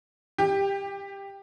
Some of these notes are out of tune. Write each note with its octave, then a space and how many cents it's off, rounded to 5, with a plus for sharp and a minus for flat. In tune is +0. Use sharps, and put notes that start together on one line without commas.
G4 +10 G5 +35